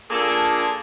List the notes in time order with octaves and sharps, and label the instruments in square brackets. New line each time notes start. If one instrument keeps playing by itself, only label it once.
[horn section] A#3 D4 F4 G#4 A4